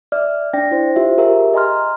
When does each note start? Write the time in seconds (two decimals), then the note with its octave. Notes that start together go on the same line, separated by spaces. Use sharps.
0.12 D5 E5 F6
0.53 D4 D5 G5 A#6
0.71 E4 C5
0.96 F4 G4 C5 E5
1.18 G4 G#4 A#4 E5 F5
1.54 D#5 G#5 A#5 C6 F6